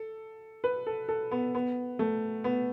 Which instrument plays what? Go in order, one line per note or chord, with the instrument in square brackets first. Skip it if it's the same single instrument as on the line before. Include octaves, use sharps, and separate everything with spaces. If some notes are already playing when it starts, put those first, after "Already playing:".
Already playing: [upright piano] A4
B4
A4
A4
B3
B3
A3
B3